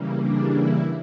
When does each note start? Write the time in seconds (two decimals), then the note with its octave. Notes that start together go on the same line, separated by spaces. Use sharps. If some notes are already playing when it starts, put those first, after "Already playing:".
Already playing: C#3 E3 G3 A#3
0.21 D4
0.51 E4